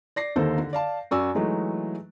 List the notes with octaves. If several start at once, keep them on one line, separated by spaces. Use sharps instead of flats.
D5 A#6 C7
D#2 D3 D#3 A#3 A4 C5
D3
D5 F5 A5
F#2 F#4 D5 G#5 E6
E3 F#3 G#3 A3 D#4